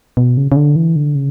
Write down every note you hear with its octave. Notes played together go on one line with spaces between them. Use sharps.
B2
C#3
C#3
D3
E3
D3
C#3